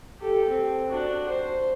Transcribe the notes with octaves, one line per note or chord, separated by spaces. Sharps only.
G4 A4
C4
D4 F#4
C5